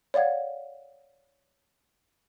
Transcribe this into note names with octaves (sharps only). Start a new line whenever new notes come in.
C#5 D5 F5 F#5 G#6